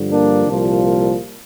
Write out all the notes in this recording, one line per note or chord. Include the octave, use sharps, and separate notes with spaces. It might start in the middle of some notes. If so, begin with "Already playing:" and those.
Already playing: G2 D3 F3
A#3 D4
C2 A#2 F3